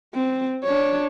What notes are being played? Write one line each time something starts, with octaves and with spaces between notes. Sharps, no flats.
C4
D4 C#5